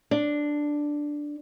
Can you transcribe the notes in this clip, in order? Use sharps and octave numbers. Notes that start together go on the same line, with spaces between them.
D4